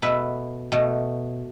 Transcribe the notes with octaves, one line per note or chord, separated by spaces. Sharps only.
B2 A3 B4 E5
B2 A3